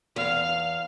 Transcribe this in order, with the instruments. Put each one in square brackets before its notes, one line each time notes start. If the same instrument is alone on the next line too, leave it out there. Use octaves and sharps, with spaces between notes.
[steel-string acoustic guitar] E2 [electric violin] F5